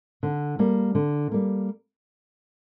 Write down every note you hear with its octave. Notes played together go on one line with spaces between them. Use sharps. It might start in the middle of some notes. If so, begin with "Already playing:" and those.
D3
G3 A#3
D3
G3 A#3